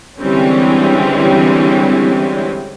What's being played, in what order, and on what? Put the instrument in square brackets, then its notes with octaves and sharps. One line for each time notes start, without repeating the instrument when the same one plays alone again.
[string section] D3 E3 G3 G#3 C4 C#4